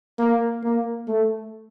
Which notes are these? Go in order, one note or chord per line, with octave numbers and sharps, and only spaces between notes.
A#3
A#3
A3